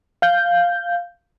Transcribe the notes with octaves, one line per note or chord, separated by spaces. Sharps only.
F5 G6